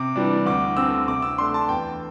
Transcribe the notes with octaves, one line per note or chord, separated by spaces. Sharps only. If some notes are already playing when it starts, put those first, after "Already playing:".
Already playing: C3 D6
E3 G3 D4
D2 D6
D3 C4 E6
C3 D6
E6
A3 D4 C6
A5
E2 G5